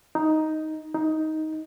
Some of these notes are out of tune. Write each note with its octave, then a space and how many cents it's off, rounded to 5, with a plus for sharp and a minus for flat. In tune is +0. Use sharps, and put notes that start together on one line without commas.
D#4 +5
D#4 +10